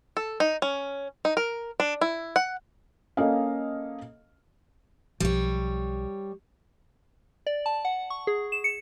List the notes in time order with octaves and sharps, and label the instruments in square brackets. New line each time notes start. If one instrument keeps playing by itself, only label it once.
[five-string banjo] A4
D#4
C#4
D#4
A#4
D4
E4
F#5
[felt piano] A#3 C#4 A4 D#5 F5
[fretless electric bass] B1 F3 [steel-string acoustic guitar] G3 C#5
[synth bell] D5
A5
F#5
C#6
G#4
E7
C#7